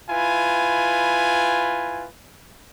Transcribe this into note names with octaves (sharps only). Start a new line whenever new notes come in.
E4 F4 B4 G#5